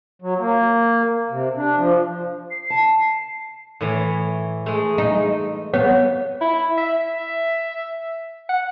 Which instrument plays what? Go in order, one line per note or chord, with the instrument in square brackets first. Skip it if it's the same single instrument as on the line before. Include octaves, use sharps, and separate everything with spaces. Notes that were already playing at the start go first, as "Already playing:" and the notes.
[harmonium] F#3
A#3
C3
D4
F3
[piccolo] C7
[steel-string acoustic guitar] A5
[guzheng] A2 E3 C#5
[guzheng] G#3 A3 [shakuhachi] G#4
[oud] D#4
[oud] B3 [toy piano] C#5 [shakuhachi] F#5
[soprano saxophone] E4
E5
F#5